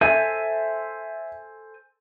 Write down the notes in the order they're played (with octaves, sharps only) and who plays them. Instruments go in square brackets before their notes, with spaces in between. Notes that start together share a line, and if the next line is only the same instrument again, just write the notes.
[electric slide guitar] A4 C5 G#5 [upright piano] E5